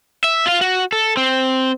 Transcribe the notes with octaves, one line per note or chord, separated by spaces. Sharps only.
E5
F4 F5
F#4
A4
C4